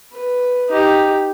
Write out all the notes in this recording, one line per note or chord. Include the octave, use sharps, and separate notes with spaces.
B4
D#4 G4